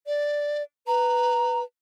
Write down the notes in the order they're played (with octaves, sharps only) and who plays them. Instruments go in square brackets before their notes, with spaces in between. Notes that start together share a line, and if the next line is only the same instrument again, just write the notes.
[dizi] D5
[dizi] B4 [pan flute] A#5